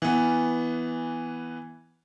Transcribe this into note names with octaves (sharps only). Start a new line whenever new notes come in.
E3 B3